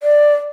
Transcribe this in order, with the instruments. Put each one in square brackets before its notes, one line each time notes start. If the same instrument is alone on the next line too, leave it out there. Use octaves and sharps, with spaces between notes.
[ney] D5